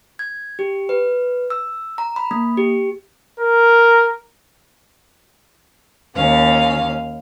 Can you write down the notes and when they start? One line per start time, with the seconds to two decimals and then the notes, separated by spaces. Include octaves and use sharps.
0.19 G#6
0.59 G4
0.89 B4
1.50 E6
1.98 A#5
2.16 B5
2.31 A#3
2.57 G4
3.40 A#4
6.15 D#2 C#4 F5